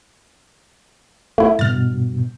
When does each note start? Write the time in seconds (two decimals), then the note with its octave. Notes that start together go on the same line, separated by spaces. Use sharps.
1.38 A3 E4
1.59 G2 B2 F6 A6